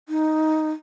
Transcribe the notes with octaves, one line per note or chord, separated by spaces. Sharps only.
D#4